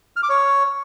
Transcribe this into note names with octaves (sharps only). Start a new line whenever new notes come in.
F6
D6
C#5